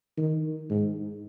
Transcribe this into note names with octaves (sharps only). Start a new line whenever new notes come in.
D#3
G#2